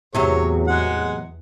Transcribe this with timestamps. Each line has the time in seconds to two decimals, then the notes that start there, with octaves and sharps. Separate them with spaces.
0.14 E2 A2 C3 F#3 F#4 G#4 C#5
0.68 G#3 F#5